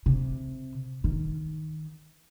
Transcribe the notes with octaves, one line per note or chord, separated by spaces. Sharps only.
C3
D#3